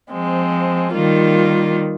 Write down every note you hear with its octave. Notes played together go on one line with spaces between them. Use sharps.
F3 G#3 C4
D#3 G3 A#3 F4